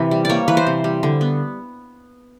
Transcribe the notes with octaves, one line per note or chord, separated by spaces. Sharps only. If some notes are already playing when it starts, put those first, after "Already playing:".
Already playing: C3 E3
G3
A#3 C#5 D5
E3 B4
C5
C3
G3
D3
B3